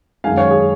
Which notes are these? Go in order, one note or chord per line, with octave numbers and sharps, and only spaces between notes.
F#2 D#3 G#3 F5 G#5
C#5 F5
G#4